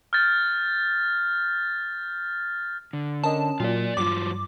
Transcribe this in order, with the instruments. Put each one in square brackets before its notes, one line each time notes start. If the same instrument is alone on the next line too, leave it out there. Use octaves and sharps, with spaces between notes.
[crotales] F6 G6 A6
[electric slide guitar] D3
[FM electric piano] C#4 A#4 D#5 [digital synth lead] A5
[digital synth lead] A#2 [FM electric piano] F#3 A#3 [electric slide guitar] F4 D5
[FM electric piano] G2 [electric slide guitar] F#3 F4 [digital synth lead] D6